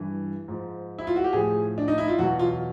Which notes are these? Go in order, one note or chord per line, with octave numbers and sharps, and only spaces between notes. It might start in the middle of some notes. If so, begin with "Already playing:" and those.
Already playing: G2 E3
G#2 F3
E4
F4
F#4
G4
A2 F3 G#4
D4
D#4
E4
F4
E2 B2 F#3 F#4
F4